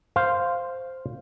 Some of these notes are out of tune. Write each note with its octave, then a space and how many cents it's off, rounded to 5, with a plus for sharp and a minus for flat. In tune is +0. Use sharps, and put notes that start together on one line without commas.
C5 +0 F5 +0